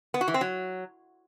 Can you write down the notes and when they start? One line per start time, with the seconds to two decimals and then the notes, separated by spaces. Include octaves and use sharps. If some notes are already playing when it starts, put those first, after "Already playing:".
0.14 B3
0.21 F#4
0.28 E3
0.34 C4
0.41 F#3